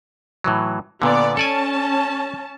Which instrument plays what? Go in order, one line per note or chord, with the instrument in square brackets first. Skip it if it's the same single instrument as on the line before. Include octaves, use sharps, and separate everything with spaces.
[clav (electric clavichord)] A2 E3 F#3
[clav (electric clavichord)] A#2 D3 [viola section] B3 D5
[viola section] C#4 A5 [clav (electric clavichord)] A4 D5 G#5